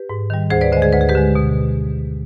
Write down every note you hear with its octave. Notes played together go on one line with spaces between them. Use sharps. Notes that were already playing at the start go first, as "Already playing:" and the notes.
Already playing: G4 B4
G#2
D#3 G3
D2 G#4 C5
B4 D5
D3 G#3 C5 D#5
G#4
D2 B4
G#4
G4 B4
D3 G#3
B2